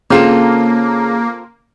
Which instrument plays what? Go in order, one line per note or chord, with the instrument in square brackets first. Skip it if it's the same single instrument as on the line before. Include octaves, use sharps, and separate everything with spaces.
[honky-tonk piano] C#3 [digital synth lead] A#3 [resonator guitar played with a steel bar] C4 F4 A4